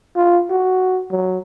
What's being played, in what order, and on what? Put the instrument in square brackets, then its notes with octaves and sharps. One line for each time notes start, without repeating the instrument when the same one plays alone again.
[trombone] F4
F#4
F#3